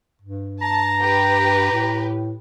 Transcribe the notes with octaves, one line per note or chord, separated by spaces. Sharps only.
G2
A5 A#5
G4 B4
A2